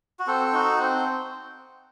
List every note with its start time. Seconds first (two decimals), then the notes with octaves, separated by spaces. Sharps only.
0.19 F#4
0.27 C4 A4
0.53 D#4 F#4
0.79 C4